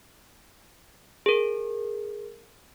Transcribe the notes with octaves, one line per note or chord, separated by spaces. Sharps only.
G#4 A#4